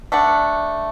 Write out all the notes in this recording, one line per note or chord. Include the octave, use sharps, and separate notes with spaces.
A3 D4 F#5